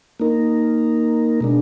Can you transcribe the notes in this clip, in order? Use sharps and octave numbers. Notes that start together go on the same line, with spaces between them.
A#3 D#4 A#4
B2 G#3 D4